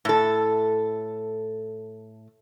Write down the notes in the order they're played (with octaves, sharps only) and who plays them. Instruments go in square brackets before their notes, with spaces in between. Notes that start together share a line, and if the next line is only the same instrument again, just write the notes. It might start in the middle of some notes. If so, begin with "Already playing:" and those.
[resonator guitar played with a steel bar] A2 A4